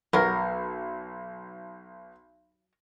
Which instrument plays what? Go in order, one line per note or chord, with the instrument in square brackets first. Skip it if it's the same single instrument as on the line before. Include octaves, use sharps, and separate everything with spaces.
[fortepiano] B1 [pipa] F#3 A#4